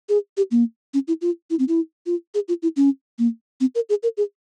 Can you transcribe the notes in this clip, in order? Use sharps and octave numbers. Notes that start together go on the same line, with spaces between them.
G#4
G4
A#3
C#4
E4
F4
E4
C4
E4
F4
G#4
F4
E4
C#4
A#3
C4
A#4
G#4
A#4
G#4